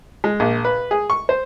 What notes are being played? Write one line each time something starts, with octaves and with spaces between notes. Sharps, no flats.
G#3
A#1
B4
G#4
C#6
C5